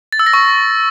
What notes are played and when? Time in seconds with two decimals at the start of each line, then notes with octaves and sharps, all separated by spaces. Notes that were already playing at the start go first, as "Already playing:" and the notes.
0.13 A6
0.19 E6
0.26 A#6
0.33 C#6